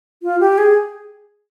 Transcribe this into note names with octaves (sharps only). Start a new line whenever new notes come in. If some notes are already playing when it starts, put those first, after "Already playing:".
F4
G4
G#4